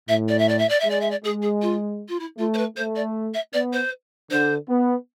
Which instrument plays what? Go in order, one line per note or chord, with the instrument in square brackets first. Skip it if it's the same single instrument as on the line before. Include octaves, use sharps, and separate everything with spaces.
[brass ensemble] A2 [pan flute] E5
[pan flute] D5
E5
D5
E5
D5
E5
[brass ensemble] G#3 [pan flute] D5
[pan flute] E5
D5
[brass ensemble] G#3 [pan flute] G#4
[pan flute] G#4
F4
F4
E4
[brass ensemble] A3 [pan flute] F4
[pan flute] C5
B4
[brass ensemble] A3 [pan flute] C5
[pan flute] D5
E5
[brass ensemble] B3 [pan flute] D5
[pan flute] C5
[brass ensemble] D3 [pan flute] C5
[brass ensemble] B3